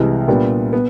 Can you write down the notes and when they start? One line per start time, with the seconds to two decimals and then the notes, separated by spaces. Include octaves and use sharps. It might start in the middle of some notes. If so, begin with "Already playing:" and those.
Already playing: C2 C3 E3 G#3
0.28 A#2 G3 B3 D4
0.73 B3